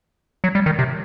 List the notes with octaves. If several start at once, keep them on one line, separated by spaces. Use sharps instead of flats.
F#3
G3
D#3
C3